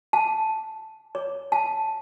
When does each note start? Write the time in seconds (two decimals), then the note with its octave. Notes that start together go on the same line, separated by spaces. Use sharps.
0.13 A5
1.15 C#5
1.52 A5